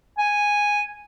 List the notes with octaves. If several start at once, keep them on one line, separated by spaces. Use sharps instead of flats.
G#5